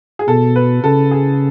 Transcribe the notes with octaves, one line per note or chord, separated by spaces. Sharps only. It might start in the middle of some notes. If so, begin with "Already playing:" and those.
G#4
B2 A4
B4
C#3 A4
G#4